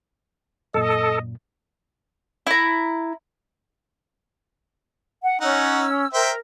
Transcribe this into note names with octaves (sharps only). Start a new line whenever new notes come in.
F#2 A#2 A4 D#5
E4 A#5
F#5
C#4 D#4 F#5 E6
A#4 C5 E5 G5